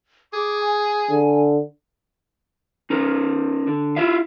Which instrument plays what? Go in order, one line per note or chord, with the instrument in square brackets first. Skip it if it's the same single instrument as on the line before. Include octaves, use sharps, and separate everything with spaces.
[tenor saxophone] G#4 [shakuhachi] D6
[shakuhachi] G#5
[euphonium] D3
[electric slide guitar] C#4 D#4 A#4
D3
E4 F4 E5 F5